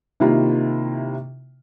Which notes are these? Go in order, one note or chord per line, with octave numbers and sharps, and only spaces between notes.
C3 D#3 A#3 E4 F4